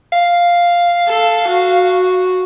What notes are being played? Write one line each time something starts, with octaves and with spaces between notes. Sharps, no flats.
F5
A4
F#4